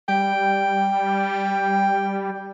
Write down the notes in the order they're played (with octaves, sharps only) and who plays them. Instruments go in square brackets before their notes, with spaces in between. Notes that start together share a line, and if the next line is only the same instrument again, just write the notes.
[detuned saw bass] G3 [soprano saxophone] G5